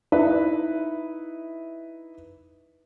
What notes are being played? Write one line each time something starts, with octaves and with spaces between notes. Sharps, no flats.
D#4 E4 B4